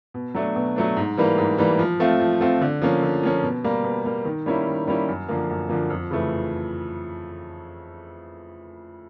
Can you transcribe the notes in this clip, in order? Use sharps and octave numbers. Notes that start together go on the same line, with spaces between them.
B2
F#3 A3 D4
B2
F#3 A3 D4
G#2
E3 G3 A#3
G#2
E3 G3 A#3
F3
A3 C4 F4
F3
A3 C4 F4
D3
F3 A#3 C#4
D3
F3 A#3 C#4
B2
G3 A#3
B2
G3 A#3
D#3
G3 A#3 C#4 E4
D#3
G3 A#3 C#4 E4
F#2
D3 F3 A#3
F#2
D3 F3 A#3
F2
C#3 E3 A3